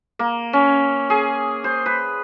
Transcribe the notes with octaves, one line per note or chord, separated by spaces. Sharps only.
A#3
C#4
G#4
C5
B4